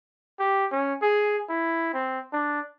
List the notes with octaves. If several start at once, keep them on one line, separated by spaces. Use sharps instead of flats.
G4
C#4
G#4
E4
C4
D4